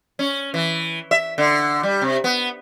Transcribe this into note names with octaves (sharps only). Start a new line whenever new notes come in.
C#4
E3
E5
D3
G3
C3
B3